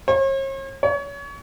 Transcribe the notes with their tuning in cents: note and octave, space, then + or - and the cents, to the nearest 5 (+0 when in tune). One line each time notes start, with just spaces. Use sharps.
C#5 -45
C#5 +30